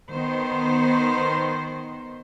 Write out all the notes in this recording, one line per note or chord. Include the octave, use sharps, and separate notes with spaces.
D#3 B3 C5